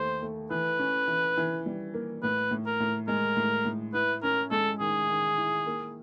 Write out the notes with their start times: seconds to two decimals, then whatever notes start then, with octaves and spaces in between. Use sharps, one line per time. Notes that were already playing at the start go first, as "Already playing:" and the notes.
Already playing: D#2 D#3 A3 C5
0.22 A3
0.50 E3 B4
0.79 C#4
1.08 E3
1.37 E3
1.66 G3
1.94 A#3
2.23 A2 B4
2.51 A2
2.66 A#4
2.80 A2
3.08 G#3 A#4
3.37 A2
3.65 A2
3.94 E4 B4
4.23 C#4 A#4
4.51 G#3 A4
4.80 D#3 G#4
5.09 D#3
5.38 E4
5.66 A#3